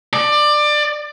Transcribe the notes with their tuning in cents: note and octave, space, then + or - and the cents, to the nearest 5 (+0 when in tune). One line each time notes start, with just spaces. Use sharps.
D5 +20